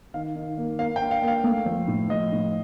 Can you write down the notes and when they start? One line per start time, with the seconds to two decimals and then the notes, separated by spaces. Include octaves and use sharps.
0.14 D#3 F5
0.36 D#3
0.58 A#3
0.79 A#3 F5
0.96 D4 G5
1.11 F5
1.22 A#3
1.28 F5
1.44 A3
1.66 F3
1.88 A2
2.10 F3 D#5
2.32 A2